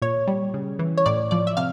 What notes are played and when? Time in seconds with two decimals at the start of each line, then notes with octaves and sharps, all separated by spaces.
0.02 A#2 C#5
0.27 G3
0.54 C#3
0.79 E3
0.97 C#5
1.06 A2 D5
1.31 F3 D5
1.47 E5
1.57 C3 F5